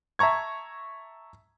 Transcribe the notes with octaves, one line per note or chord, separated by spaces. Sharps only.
E5 A5 A#5 C#6 G#6